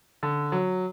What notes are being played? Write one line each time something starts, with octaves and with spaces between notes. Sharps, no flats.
D3
F#3